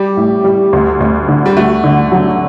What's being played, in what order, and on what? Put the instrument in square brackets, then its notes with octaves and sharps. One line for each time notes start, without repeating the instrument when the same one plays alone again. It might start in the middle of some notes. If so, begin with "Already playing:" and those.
Already playing: [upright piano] G3 [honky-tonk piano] G4
[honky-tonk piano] A2
G3
D2
D2
D3
[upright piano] G3
[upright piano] A3 [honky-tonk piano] F#4
[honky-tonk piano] D3
F#3